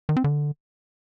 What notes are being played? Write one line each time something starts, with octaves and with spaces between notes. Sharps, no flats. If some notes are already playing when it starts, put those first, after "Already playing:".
D#3
C4
D3